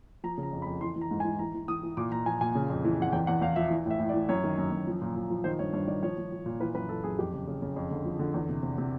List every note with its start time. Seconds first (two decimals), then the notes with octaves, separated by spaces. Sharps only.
0.24 F3 A#5
0.38 C#3
0.43 A#5
0.53 F2
0.62 B5
0.66 F2
0.81 E3 C6
0.96 E3
1.01 A#5
1.11 G#2
1.20 G#5
1.25 E3
1.39 E3 A#5
1.54 E3
1.68 E3 D#6
1.83 E3
1.97 A#2 D6
2.12 A#2 A#5
2.26 F3 G#5
2.41 A#2 G#5
2.55 C#3
2.69 F2
2.84 E3
2.99 F2 F#5
3.12 E2 G5
3.27 E2 F#5
3.41 E2 F5
3.56 F3 E5
3.70 E3
3.86 A2 E5
4.00 A2
4.09 D5
4.14 E3
4.29 F#2 C#5
4.44 D#3
4.58 F#2
4.72 F#2
4.87 F3
5.02 A#2
5.16 A#2
5.30 F3
5.44 D#3 C5
5.59 G2 C#5
5.73 G2 C#5
5.87 D#3 D5
6.03 F3 C#5
6.17 F3
6.32 F3
6.46 A#2
6.60 E3 B4
6.75 F#2 B4
6.89 E3 A4
7.04 F#2 G#4
7.19 F2 G4
7.33 C#3
7.47 C#3
7.62 C#3
7.76 F2
7.91 D3
8.05 F3
8.19 D3
8.34 E2
8.49 C3
8.63 C3
8.78 C3